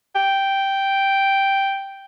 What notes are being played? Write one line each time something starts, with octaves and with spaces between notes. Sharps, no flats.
G5